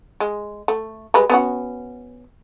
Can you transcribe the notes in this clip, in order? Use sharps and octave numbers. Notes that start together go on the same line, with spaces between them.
G#3
A3
G3 G#3 B4
B3 C#4 F#4